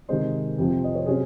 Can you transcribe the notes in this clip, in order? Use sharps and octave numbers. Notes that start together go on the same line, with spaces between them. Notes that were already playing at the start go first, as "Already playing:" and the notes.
C3 D#3 G#3 C4 C5 D#5
F2 C3 F3 C4
D#5
C#5
C3 F#3 C#4 G#4 C5